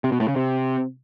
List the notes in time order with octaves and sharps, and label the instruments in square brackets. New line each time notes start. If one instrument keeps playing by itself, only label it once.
[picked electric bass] C3
B2
A2
C#3
C3